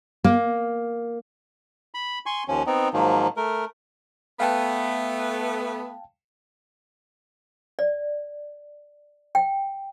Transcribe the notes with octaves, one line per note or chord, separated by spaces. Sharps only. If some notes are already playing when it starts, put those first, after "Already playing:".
A#3
B5
G#5 C6 C#6
D#2 F3 C#4
B3 C4 D#4
G#2 D#3 F3 F#3 A#3
A3 A#4
A3 B3 F5 G5 A5
D5
G5